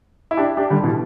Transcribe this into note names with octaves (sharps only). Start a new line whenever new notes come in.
E4
D4 G4
D4 G4
D3 G3
B2 E3